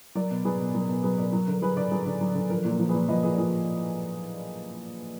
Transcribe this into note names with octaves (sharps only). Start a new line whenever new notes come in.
F#3 A#4 D5
B2
F#3 G#4 B4
B2
F#3 A#4
B2 A#4
F#3 G#4 B4
B2 A#4 D5
F#3 A#4
D3 A#4
F#3 G#4 B4
D3 A#4 D5
F#3 G#4 B4
D3
F#3
D3
F3 A#4
A#2 A#4
F3
A#2 G#4 B4
F3 B4 D#5
A#2 G#4 B4
D5
F3 G#4 B4